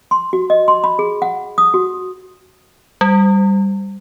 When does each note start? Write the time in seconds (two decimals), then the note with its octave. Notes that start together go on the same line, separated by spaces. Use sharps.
0.11 C6
0.33 F#4
0.50 D#5
0.68 C6
0.84 B5
0.99 G#4
1.22 F#5
1.58 D#6
1.74 F#4
3.01 G3